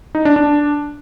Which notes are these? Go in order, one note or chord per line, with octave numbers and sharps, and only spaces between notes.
D#4
D4
D4